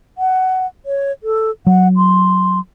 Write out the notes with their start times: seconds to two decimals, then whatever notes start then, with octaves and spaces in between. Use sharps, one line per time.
0.18 F#5
0.86 C#5
1.23 A4
1.67 F#3 F#5
1.97 C6